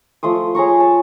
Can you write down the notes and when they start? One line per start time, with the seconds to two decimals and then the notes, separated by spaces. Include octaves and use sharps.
0.23 F3 A3 C6 D#6
0.55 G#4 C#5 A#5 C#6
0.80 A5